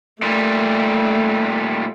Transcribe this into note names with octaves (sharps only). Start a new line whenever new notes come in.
A#2 G3 A3